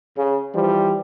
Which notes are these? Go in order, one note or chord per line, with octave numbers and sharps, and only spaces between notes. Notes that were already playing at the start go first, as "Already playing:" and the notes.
C#3
E3 F3 G3